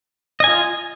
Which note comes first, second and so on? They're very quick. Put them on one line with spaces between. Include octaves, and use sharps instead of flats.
D#5 G#5 F4